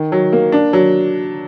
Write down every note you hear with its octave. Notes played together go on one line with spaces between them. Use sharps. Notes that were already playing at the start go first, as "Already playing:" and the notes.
Already playing: D#3
F#3
A#3
D4
F#3